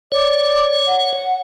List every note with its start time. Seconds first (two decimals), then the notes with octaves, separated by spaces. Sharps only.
0.12 C#5 D5
0.87 F#5